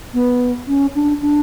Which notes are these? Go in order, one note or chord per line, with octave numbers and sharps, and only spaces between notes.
B3
C#4
D4
D4